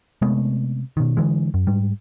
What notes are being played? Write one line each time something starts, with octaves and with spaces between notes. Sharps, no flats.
C3 G#3 A3 B3
B2 D#3
D3 E3 G#3
F#2
G#2 G3